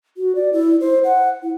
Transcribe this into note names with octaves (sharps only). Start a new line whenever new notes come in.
F#4
D5
E4
C5
F#5
E4